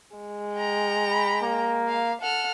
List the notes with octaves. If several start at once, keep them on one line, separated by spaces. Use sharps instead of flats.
G#3
G5 A#5
B5
A#3
F5
A4 F#5 F6